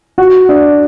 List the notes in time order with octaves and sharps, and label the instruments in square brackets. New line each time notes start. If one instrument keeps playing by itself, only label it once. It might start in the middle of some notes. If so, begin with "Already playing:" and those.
[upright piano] F#4
D4